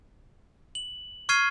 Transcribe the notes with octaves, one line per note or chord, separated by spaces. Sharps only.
F#7
C#6 F6 G#6 C7 D#7